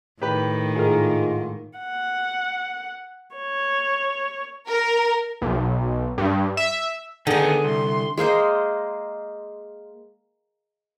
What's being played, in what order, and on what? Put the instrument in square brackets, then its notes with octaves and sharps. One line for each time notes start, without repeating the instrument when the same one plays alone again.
[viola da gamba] A2 D#3 [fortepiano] G4 B4
[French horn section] G#2 F4 [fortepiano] G#4 A#4
[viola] F#5
C#5
[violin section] A#4
[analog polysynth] B1
G2
E5
[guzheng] D3 A#5 [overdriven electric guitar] D#3 B3 [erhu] G#4
[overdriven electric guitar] C2 [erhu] C6
[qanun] G#3 A#3 C5 D#5